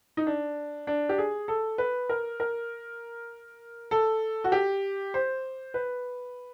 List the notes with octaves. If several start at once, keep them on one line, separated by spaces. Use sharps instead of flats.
D#4
D4
D4
G4
G#4
A4
B4
A#4
A#4
A4
F#4
G4
C5
B4